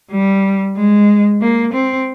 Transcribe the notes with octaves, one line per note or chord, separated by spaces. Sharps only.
G3
G#3
A#3
C4